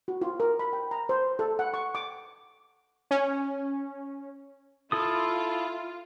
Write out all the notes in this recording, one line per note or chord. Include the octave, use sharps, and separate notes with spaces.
F#4
F4
A#4
B5
G5
A#5
C5
A4
F#5
C#6
D6
C#4
E4 F4 A4 D#6